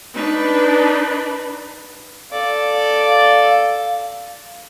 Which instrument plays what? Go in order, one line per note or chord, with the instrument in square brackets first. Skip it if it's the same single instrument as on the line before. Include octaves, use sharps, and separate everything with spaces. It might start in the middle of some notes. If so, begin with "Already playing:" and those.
[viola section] D4 D#4 B4
[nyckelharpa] A4 D5 [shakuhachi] F5